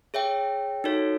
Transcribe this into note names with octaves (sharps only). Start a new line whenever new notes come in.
G#4 C#5 E5 G5
D#4 F#4 A4 C#5